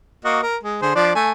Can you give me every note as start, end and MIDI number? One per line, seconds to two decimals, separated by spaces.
0.25 0.41 58
0.25 0.41 66
0.25 0.41 75
0.43 0.57 70
0.63 0.80 56
0.82 0.92 50
0.82 0.92 68
0.82 0.92 72
0.95 1.12 53
0.95 1.12 62
0.95 1.12 74
1.15 1.32 57
1.15 1.32 80